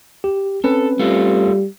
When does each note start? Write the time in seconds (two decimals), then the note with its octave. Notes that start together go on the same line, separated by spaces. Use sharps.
0.24 G4
0.64 C4 C#4 A4 B4
0.99 G3 A3 F4